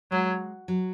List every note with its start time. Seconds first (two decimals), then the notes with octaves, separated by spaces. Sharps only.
0.12 F#3 G#3
0.68 F#3